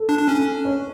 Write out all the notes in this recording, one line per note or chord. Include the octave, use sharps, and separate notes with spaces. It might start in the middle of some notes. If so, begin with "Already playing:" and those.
Already playing: A4
D4
D4
C#4
C#5